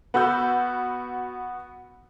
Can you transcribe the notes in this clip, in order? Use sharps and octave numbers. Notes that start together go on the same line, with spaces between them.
B3 F#4 B5 E6 G6